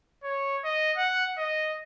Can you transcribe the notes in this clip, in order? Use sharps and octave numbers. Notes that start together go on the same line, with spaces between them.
C#5
D#5
F#5
D#5